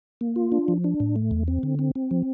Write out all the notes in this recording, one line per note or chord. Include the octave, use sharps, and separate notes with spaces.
A#3
F4
D4
F3
D4
A2
A3
E2
C4
D3
C4
C4
F3